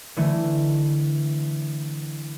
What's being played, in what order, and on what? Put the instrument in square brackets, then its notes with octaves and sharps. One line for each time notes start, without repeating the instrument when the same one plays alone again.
[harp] D3 E3 A3